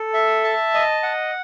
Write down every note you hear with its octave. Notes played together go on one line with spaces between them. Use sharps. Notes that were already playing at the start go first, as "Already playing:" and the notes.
Already playing: A4
E5
A5
D#5
F#5